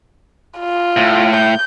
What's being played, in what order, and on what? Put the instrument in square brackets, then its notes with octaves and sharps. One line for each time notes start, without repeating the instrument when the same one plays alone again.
[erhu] F4
[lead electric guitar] A2
[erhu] G6